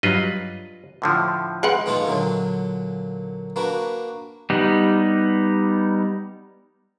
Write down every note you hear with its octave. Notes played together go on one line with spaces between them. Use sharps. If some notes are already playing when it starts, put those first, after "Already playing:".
G2 F#3 F4 B4 D#5
A2 D3 F3
G#3 B4 F#5
G#2 B2 G#3 A3 F4
A#2 D3 F#3
A#3 D4 F#4 B4
G3 B3 D#4